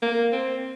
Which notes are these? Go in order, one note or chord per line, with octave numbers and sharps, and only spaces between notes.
A#3
C4